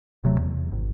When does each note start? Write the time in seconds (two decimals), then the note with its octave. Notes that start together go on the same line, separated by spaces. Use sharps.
0.24 D#1 C3 F#3 A3
0.38 E2
0.72 G#1